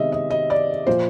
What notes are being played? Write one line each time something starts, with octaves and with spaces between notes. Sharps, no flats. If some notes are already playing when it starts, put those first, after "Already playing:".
Already playing: C3 D#3 G#3 B3 D#5 E5
D#5
D#5
D5
A#2 F3 A#3 C5